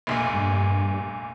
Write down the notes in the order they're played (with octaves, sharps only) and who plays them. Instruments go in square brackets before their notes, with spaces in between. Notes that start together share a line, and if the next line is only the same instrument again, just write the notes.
[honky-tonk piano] F1 A#1 A#2
[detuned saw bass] G2